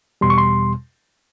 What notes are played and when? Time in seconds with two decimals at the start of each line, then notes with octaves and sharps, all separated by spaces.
0.21 E2 B2 G3 C6
0.30 C#6
0.38 C6